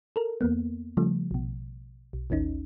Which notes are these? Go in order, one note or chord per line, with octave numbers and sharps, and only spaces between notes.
A4 A#4
E2 A#3 B3
C#3 F3 G3 A3
A#1 B2
B1
A1 D#2 C#4 D#4